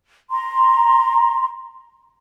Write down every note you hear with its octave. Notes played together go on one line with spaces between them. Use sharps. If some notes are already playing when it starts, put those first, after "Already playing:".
A#5 C6